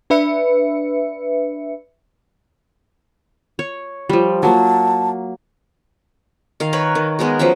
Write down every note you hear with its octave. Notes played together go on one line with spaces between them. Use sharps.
D4 B4 E5 C#7
C#5
F3 G3
F#3 A#3 A5
D#3 F5
A#4 B4 C#5 B5
D#3
G#3 B3 G#4 A#4
F3 F#3 C#4 E5